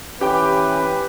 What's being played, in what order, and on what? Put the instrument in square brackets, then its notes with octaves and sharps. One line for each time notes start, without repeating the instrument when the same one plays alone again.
[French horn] E3 [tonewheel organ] C#4 [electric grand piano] G4 G5 D6 [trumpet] B4